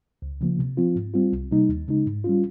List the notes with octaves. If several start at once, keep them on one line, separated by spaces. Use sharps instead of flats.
C#2
C#3 F3 A#3
C3
F3 C4 F4
G#2
G3 C4 F4
C2
C3 G3 A#3 D#4
D#2
C#3 G#3 D#4
G#2
G3 C#4 F4